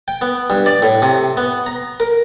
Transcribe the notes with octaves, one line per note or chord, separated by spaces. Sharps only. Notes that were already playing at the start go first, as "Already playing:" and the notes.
G5
B3
G2
D5
A2
C3
B3
A#5
A#4